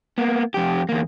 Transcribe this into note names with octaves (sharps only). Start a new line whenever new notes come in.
A#3 B3
F2 G4
E2 A#3